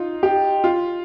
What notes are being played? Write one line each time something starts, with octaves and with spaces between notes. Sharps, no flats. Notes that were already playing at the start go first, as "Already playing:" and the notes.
Already playing: D#4 F4
G4
F4